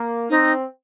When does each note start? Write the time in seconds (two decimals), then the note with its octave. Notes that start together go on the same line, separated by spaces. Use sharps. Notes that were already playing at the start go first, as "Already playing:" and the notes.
Already playing: A#3
0.30 C4 D#4